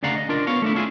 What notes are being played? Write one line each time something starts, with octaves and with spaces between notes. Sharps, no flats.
D2 C#3 D5 F5 F#5 A#5
D#5
D4 F4 A#4 D5
B3 C#4 C#5 F5
A3 D4 E4
C#4 E4 F4 G#4